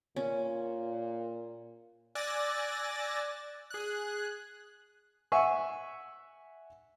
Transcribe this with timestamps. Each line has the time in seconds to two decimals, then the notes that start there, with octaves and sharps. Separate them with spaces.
0.16 A#2 C#4
2.15 D5 G#5 E6 F#6 A6 A#6
3.70 G#4 F#6
5.32 E5 F#5 G#5 C#6